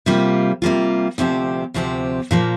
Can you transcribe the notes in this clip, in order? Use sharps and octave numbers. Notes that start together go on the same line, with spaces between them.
C3 G3 A#3 F4
C3 G3 A#3 F4
D2 C3 F3 C4 G4
D2 C3 F3 C4 G4
A#2 F3 A#3